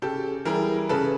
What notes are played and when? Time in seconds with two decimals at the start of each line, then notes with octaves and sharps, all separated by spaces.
0.02 C#3 G4 A4
0.45 E3 G3 G#4 A#4
0.89 C#3 A4 B4